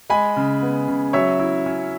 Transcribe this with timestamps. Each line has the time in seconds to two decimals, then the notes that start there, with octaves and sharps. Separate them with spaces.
0.09 G#3 G#5 B5
0.36 C#3
0.62 B3
0.88 C#3
1.13 F#3 C#5 E5
1.39 E4
1.66 C#4